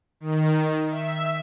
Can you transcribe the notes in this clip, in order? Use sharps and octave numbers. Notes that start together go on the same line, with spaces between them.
D#3
E5